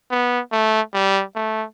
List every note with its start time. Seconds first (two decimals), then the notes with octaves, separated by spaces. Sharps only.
0.11 B3
0.52 A3
0.93 G3
1.35 A3